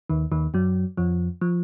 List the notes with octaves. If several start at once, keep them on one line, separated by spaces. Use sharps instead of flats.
D#2 D#3
D#2 D#3
F#2 F#3
F2 F3
F3